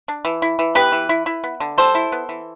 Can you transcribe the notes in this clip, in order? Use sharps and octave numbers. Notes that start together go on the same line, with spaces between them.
D4
E3
E4
E3
B3 G4 B4
E3
E4
E4
B3
D3
G3 A4 C5
E4
B3
E3